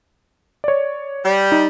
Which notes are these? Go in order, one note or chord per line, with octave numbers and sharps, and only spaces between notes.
C#5 D5
G3
D#4